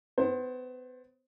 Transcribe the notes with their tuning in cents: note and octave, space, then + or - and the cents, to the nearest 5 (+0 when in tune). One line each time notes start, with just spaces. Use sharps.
B3 +35 C5 +25